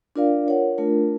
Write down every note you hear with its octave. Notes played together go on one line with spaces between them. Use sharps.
D4 F4 A#4 D5 F5
F4 A#4 C#5 F#5
A3 D4 F4 A#4